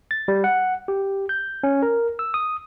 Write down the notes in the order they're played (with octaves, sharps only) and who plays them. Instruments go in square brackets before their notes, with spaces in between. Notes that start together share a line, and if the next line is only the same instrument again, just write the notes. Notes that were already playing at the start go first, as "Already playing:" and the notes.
[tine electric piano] A6
G3
F#5
G4
G6
C#4
A#4
E6
D#6